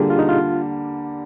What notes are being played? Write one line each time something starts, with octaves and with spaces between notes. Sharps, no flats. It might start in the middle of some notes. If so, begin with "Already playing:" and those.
Already playing: D3 G3 A#3 F4 G4 G#4
F4
D#4
F4